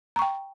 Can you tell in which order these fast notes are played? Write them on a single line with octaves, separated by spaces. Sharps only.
A#5 C#6 G5